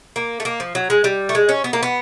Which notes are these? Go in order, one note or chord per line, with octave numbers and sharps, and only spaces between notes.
A#3
A3
A#3
F3
F#3
G#3
G3
A3
G#3
C#4
B3
A#3
B3